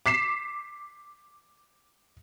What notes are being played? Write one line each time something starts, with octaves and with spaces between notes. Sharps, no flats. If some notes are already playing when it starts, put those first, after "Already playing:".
D6 B6 C7 E7